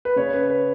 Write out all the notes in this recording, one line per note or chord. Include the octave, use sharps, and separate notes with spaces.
B4
C#3 C#5
B4
B4